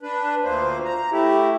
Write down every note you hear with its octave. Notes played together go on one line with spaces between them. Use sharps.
D4 B4
D2 A#2 A#3 C5
A#5
A3 E4 G4